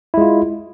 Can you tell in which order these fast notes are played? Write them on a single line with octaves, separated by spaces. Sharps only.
E4 G#3 F4